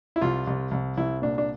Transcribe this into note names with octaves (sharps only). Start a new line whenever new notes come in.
E4
C2 F4
C2
C2
C2 E4
A#2 D4
D4